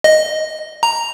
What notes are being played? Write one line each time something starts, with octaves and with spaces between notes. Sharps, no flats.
D#5
A#5